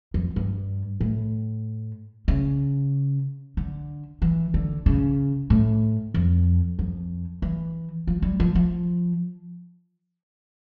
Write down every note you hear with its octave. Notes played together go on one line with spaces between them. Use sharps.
F2
G2
A2
C#3
D3
E3
D3
C#3
A2
F2
F2
E3
F3
G3
F3
F3